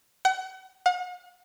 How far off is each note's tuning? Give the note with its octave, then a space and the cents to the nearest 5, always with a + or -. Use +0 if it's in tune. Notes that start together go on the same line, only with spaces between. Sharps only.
F#5 +35
F#5 -45